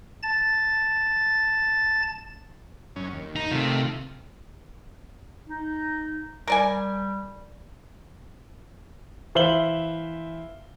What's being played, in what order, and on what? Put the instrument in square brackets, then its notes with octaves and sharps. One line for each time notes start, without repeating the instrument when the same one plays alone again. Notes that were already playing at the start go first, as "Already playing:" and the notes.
[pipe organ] A5 A6
[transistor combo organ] F#2 C#4
D#2
[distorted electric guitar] D#4
[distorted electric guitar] C3 [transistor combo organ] D#3 A3 F4
[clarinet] D#4
[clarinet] G3 [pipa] A#4 D5 G#5
[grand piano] E3 C5 E5 F5 F#7 G7